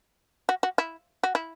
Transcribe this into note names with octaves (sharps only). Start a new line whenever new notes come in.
F#4
F#4
E4
F#4
E4